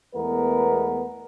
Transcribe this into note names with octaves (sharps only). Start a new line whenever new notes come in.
E2 G#3 A3 B3 A#4 B4